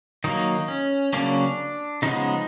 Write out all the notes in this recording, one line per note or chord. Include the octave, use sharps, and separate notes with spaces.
D#3 F#3 A#3 D#4
C#4
C#3 F#3 A#3 C#4 D4
C#3 F3 G#3 B3 D#4